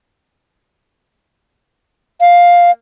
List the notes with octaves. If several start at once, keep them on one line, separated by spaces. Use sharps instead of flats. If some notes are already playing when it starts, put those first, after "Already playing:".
F5